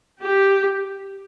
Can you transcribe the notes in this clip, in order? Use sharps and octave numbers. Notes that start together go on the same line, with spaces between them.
G4